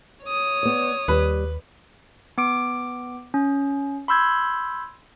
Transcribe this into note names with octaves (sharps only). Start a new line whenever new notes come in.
C#5 D#6
B3 D5
D#2 G3 B4
B3 D6 D7
C#4
B5 C6 E6 G6 G#6